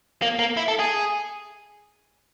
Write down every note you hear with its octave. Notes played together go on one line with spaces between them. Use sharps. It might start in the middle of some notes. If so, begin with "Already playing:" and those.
A#3
A#3
E4
A4
G#4